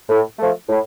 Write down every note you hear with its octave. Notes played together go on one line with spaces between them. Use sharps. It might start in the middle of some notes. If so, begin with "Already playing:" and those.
A2
F3 A3
A2